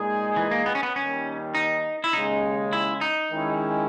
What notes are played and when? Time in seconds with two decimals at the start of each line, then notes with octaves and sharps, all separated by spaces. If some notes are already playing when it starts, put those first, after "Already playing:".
Already playing: A#2 G#3 D#4 G#4
0.36 E3
0.51 A#3
0.66 B3
0.75 C#4
0.83 B3
0.95 D#2 D#3 G3 C#4
1.55 D#4
2.04 E4
2.13 D#2 C#3 G#3 C#4 D#4
2.73 E4
3.01 D#4
3.31 D#3 G#3 C#4 E4